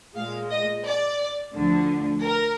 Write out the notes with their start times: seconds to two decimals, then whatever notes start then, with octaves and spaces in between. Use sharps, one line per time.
0.15 A#2 G#3 F5
0.51 D#5
0.85 D5
1.55 D2 D3 F3
2.24 A#4